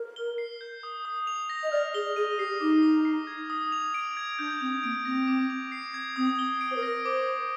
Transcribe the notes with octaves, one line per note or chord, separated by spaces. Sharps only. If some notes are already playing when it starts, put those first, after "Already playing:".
Already playing: A#4
G7
C7
G6
D#6
D#6
F7
A#6
D#5
D5 F6
G#4 G7
G#4 D#7
G4 C7
D#4 D6
G7
C7
G#6
D#6
F7
D7
G#6
D4 G6
C4 F7
A#3 D7
C4 A#6
D6
F7
C7
G#6
C4 D#6
G7
D7
C5
A#4
A#6
C5 D6
F7